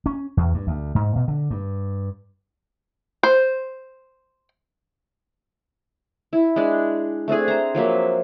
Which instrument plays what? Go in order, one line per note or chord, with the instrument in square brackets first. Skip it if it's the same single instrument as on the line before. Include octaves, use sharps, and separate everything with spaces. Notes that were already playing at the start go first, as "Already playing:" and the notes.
[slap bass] C#4
E2
G2
D2
G#2
B2
D3
G2
[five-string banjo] C5
[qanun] E4
G#3 D4
A3 C4 D4 G#4
C5 A#5
F3 F#3 A#3 E5